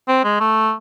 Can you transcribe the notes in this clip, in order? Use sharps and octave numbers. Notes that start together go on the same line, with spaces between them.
C4
G#3
A3